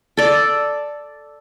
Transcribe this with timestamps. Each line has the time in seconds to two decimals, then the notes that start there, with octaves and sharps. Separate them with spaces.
0.17 A4 D5